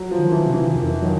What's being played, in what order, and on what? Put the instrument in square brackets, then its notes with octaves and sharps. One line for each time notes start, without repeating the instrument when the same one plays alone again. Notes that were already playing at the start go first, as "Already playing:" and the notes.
Already playing: [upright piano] F#3
F3
[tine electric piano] D#3
[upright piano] E3
[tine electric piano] C3
[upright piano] E3
[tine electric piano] F2 [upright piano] D#3
[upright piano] D#3 [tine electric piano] F#3